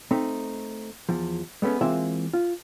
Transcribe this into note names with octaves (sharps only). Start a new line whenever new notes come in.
A3 C4 D#4
E2 F3
G#3 A3 B3 C#4
E3 G#3 A#3 C4 F4 E5
F4